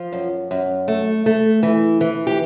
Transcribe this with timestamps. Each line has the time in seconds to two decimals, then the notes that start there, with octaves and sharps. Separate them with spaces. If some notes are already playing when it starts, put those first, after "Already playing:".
Already playing: F3 F4
0.12 F#2
0.51 F#2
0.88 A3
1.26 A3
1.63 E3
2.01 E3
2.27 G4